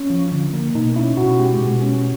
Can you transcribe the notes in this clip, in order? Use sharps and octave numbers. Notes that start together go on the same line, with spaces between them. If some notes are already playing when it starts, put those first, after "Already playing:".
Already playing: C#4
F3
D3
A#3
B2 D#4
C#4 E4
B2 F#4
G#3 G4
B2
C#4